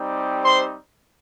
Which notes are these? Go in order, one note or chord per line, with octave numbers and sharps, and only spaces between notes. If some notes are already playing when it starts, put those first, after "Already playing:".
Already playing: G3 C4 D#4 G4
C5 C6